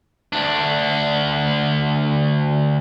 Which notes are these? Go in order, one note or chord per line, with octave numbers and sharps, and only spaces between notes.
D2 D4